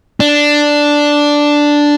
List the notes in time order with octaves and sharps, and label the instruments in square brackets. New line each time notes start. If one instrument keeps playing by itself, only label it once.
[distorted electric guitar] D4